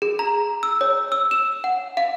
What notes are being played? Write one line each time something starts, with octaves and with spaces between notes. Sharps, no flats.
G#4
A#5
E6
C#5
E6
E7
F#5
F5